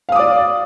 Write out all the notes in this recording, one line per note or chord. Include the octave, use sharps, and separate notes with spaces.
D5 F5 D6 D#6